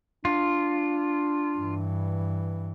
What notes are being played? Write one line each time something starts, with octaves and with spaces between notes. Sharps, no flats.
D4 F4
G2 E3